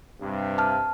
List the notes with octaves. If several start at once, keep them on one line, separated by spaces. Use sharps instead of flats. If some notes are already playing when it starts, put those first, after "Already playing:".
G2 C3
A5 F6